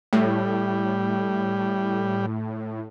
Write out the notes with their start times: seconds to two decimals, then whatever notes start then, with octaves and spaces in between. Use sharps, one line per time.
0.13 A2 G3